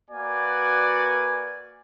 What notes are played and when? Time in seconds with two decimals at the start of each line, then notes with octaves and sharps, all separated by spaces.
0.11 A#3 F#4 B4 D5 G#5